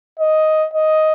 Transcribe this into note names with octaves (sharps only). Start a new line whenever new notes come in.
D#5
D#5